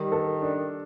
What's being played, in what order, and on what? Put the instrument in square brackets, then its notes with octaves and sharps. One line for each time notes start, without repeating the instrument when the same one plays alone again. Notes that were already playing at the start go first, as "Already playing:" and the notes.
Already playing: [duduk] D#3 [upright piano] G3
[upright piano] A4
D4